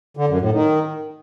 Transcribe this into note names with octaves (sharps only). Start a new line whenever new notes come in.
D3
F#2
A2
D#3